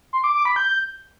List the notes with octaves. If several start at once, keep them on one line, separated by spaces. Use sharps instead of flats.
C6
D6
D6
B5
G6